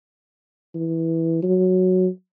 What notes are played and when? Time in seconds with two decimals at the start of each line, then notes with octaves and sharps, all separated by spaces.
0.75 E3
1.43 F#3